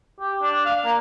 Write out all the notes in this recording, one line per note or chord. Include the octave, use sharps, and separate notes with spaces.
G4
D4
F5
A#3